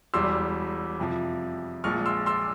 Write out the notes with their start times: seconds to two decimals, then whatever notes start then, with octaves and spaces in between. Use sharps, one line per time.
0.14 E1 E2 E3 G3 C6 E6
0.99 F2 C3 F3
1.84 A#1 A#2 F3 G#3 C#6 F6
2.06 C6 E6
2.26 C6 E6